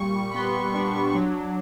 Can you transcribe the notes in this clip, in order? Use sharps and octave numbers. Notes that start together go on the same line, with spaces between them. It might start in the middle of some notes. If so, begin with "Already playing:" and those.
Already playing: A#2 G3 C#6
B5
B3 C6
D4
F#3